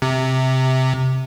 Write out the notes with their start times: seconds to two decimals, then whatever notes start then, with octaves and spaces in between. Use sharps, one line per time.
0.02 C3